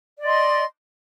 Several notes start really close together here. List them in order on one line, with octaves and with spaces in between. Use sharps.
D5 D#5 C6